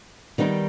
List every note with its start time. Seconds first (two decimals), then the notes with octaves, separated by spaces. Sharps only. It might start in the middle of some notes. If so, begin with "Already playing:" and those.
0.38 D#3 G3 B3 D#4